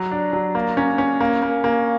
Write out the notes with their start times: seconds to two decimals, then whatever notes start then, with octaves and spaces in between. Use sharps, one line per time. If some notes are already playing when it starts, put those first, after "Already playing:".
Already playing: F#3
0.11 D4
0.33 F#3
0.55 A#3
0.77 C#4
0.98 C#4
1.20 A#3
1.43 A#3
1.64 A#3